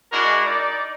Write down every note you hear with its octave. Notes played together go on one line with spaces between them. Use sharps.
G#3 D4 E4 F#4 A#4
D#4 D5